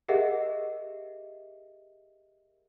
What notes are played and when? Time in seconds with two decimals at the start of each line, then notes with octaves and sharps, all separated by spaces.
0.08 G4 G#4 A#4 D#5 E5 F#5